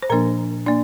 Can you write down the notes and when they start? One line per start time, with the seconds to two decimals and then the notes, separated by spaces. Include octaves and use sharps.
0.03 C5
0.10 A#2 F3 A#3 D4 A#4
0.67 A#3 D4 D5